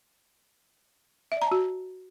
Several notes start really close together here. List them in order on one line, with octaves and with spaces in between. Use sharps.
E5 D5 A#5 A5 F#4